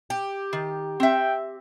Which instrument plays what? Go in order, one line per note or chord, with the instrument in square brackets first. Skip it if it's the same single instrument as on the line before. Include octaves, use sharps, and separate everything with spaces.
[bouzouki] G4
[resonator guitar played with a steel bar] D#3
[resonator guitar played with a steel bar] C4 E5 [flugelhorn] G5